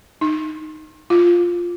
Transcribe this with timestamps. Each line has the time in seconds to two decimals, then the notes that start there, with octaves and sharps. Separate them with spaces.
0.21 D#4
1.10 F4